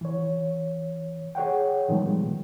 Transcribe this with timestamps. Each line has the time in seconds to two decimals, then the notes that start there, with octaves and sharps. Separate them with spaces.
0.01 E3 C#5
1.35 G#4 C#5 F#5 G5
1.88 A#2 D#3 F3 G3 G#3 B3